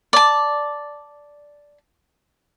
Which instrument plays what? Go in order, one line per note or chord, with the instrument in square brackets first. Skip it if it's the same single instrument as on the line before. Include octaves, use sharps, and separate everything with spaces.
[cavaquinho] D5 A5